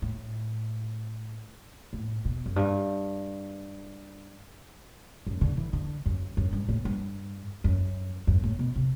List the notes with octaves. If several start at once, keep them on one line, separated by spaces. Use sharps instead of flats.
A2
A2
B2
F#2
G2
F#2
D3
E3
D3
F#2
F#2
G2
A2
G2
F#2
F#2
A2
B2
C3